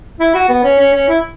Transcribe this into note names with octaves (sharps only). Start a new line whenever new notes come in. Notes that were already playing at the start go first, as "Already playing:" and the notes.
E4
F#4
B3
C#4
C#4
C#4
E4